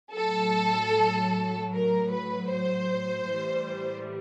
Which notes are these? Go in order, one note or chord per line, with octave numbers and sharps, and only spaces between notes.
A2 F#3 A4
A#4
B4
C5
A2 E3 G3